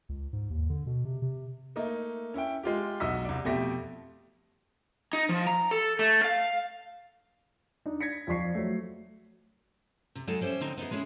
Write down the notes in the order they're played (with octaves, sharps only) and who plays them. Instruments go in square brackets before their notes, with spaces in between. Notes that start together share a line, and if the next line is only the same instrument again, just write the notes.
[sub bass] C#2
G#2
D#2
D3
B2
C3
C3
[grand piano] A3 A#3 D#4 D#5
C#4 E4 E5 G5
G#3 F4 G4
B1 F#4 D#5 D#6 E6 B6
C2 D5
F2 B2 A3 G4 A#6 B6
[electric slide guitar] D#4
F3
A#5
A4
A3
F5
[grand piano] D4 D#4
G#6 A#6 B6 C#7
F2 F3 D5 C#6 B6 C7
F#3 A3
[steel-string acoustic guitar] C3
F#3 G#3 D#4 A4 D#5
G3 C#4 C5 E5
D3 C4 D#4
B3 D#4 E4 G#4
G#3 C#4 E4 G#4